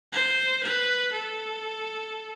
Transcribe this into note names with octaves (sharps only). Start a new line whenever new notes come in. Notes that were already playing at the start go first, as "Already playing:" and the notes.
C5
B4
A4